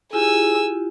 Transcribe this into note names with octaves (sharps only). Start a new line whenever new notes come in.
E4 F4 G4 G#4 G#5 E6